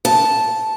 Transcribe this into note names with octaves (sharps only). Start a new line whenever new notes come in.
A5